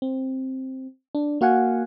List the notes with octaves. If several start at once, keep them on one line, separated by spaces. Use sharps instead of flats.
C4
D4
A#3 F#4 F5 F#5 G#5